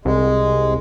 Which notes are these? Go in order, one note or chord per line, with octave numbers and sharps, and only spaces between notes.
C2 G#3